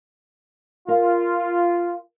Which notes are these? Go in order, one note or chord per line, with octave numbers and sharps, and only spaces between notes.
F4 A#4 F5